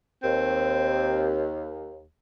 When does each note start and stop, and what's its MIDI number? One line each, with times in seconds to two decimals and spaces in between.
0.23 2.03 39
0.23 1.44 60